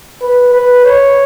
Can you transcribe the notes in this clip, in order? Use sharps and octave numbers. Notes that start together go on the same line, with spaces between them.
B4
B4
C#5